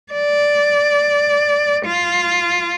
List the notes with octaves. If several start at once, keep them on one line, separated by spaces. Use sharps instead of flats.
D5
F4